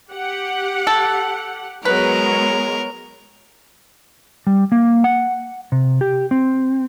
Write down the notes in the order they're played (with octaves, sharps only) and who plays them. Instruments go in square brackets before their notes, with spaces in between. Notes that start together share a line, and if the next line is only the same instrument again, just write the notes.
[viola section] G4 F#5
[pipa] A4
[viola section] F#3 G#3 B3 [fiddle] A#4 [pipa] B4
[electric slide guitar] G3
A#3
F#5
C3
G4
C4